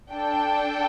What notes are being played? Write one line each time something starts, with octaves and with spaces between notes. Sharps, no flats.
D4 A4 G5